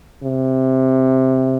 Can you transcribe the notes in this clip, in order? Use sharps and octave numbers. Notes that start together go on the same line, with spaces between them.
C3